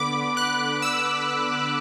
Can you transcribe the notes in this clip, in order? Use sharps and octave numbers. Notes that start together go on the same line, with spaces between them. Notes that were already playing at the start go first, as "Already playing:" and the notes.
Already playing: D3 B3 B5 D6
F#6
E6